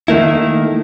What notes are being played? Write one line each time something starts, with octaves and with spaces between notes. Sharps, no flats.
D#3 A3 A#3 E4